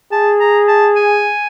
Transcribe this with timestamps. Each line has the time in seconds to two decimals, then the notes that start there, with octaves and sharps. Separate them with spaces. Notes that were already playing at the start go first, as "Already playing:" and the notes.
0.12 G#4 A5
0.40 A#5
0.68 A5
0.96 G#5